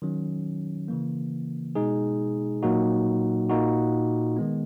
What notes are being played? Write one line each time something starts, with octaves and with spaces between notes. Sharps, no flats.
D#3 F#3 C#4
C#3 E3 A#3
B2 G#3 D#4 G#4
A#2 F#3 A#3 D#4 F#4
A#2 A#3 D#4 F#4
D#3 G#3 B3